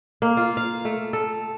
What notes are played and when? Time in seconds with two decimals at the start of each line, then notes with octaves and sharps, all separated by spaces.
0.22 A#3
0.37 F4
0.57 F5
0.85 A3
1.13 A4